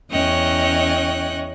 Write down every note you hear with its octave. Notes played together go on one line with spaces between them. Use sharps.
E2 C#4 C#5 D#5 G5 F#6